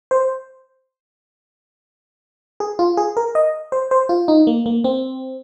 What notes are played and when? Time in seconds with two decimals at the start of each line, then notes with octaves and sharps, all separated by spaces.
0.11 C5
2.60 G#4
2.79 F4
2.97 G#4
3.17 A#4
3.35 D#5
3.72 C5
3.91 C5
4.09 F4
4.28 D#4
4.47 A#3
4.66 A#3
4.84 C4